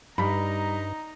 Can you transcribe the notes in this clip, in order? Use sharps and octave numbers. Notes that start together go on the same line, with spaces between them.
G2 G3 D#4 A#5 B5